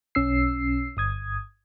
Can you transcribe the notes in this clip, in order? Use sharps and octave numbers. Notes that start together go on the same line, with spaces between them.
B1 C#4 E6 C7
G1 D#6 G#6